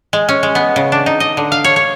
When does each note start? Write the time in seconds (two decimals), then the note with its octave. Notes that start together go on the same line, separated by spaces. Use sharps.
0.13 G#3
0.29 C#4
0.43 G#3
0.55 B3
0.76 C#3
0.92 D4
1.06 D#4
1.20 D#5
1.37 D3
1.52 F5
1.64 C#5
1.76 C#5